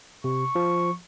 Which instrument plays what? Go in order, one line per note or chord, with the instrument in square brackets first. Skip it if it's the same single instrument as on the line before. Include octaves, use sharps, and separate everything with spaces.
[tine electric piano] C3 [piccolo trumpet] C#6
[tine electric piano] F3